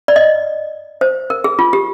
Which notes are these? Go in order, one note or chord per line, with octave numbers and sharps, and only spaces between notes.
D5
D#5
C5
A#4
G#4
F4
G4